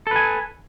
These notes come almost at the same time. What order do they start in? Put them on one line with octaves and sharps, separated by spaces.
A4 B4 G#5